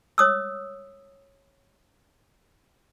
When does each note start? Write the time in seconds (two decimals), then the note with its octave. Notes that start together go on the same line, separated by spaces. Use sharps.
0.18 C#5 D#6 E6